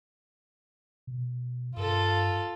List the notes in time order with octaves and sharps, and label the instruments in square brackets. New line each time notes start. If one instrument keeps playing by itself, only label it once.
[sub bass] B2
[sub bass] G2 [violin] F4 A4